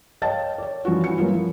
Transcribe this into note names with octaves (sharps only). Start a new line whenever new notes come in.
C#5 D#5 F5 G5 A5 A6
C#5 D5
E3 F3 C#4 F4 F#4
E3 F#4 C#7
F#3 A#3 B3 F4
E3 F3